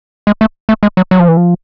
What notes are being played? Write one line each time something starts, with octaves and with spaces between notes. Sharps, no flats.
G#3
A3
A3
G#3
F#3
F#3
F3
E3
F3